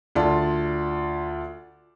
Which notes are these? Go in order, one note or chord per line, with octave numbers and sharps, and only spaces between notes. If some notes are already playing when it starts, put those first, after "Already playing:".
D2 F4 D5 A5